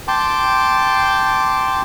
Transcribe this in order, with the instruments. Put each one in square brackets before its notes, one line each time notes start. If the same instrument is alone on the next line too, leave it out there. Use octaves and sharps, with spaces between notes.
[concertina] G5 A5 C6 D6